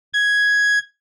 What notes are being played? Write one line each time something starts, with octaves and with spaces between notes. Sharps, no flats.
G#6